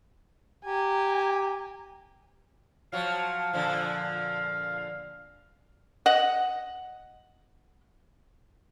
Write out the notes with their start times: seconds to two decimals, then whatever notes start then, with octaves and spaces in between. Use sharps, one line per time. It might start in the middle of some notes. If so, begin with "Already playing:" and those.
0.64 G4 G#5 A#5
2.92 F3 F#3 F5
3.53 A#2 D3 F3
6.06 D#5 F#5